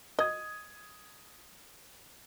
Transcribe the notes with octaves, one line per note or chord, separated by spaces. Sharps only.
D#5 D#6 G#6